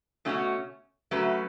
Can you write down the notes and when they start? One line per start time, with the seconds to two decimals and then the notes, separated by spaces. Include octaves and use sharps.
0.25 B2 A3 C#4 F#4 C#5
1.11 F#3 A3 C#4 F#4 B4